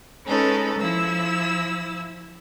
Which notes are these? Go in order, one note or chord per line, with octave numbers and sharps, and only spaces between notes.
G#3 C#4 D#4 A4 B4
F3 E4 E6